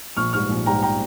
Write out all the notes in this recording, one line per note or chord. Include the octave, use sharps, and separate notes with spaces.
A#1 C#6 F6
G#2 G3 C#6 F6
A#1
G#2 G3 G5 A#5
G5 A#5